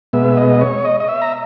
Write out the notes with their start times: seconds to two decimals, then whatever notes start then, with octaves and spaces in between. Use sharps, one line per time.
0.13 B2 G#3 B3 E5
0.37 D#5
0.61 C#5
0.85 D#5
1.00 D#5
1.09 E5
1.22 A#5